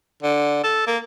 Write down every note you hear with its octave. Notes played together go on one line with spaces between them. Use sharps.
D3
A4
A#3